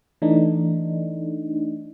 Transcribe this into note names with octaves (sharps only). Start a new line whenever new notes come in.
E3 A3 D4 D#4